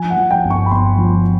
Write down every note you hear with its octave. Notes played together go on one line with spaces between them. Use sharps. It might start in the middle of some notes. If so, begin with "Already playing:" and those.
Already playing: F3 G#5
F#5
F3
G5
G1
C#6
B5
G1 C6
F3